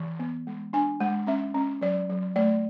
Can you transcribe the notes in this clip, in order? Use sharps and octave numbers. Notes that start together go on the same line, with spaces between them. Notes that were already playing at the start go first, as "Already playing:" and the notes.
Already playing: E3
B3
G#3
D4 G#5
G#3 F#5
C#4 E5
C#4
F#3 D5
F#3
A3 D5